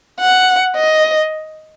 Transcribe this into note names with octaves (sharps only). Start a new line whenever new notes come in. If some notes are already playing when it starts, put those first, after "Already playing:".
F#5
D#5